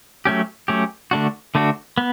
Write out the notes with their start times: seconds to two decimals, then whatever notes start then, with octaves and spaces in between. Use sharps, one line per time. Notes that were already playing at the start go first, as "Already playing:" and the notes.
0.25 F#3 A3 C#4 G4
0.68 F#3 A3 C#4 G4
1.11 D3 A3 D4 F#4
1.55 D3 A3 D4 F#4
1.98 B3